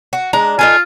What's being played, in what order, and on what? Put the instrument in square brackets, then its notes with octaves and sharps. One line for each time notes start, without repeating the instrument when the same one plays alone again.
[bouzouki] F#4
[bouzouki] G#3 D4 [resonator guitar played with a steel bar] A#5
[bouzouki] D#4 A4 G#5 [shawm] F4